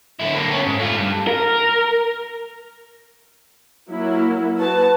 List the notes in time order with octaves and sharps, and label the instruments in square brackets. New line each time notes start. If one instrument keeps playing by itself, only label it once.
[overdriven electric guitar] D3 E4
D3 A#3
B3 C#4
G#2
A3 F4
G2
[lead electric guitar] A#4
[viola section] F#3 A#3 E4
[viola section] F#4 A5 [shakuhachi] B4